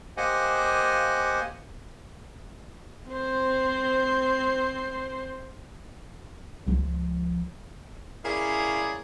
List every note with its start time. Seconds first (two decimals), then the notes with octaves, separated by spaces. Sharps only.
0.17 A#3 G4 C5 D#5 F#5 G#5
3.09 C4 C5
6.67 C#2 F3
8.25 A#3 C#4 E4 G#4 C#5 D5